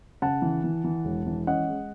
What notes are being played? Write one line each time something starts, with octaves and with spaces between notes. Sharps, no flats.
C#3 F#5 A5
E3
E3
E3
E1
E3
C#4 D#5 F#5
G#3